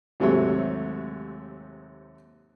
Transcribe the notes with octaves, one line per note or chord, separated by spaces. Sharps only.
D#2 G#2 C3 F#3 A3 C#5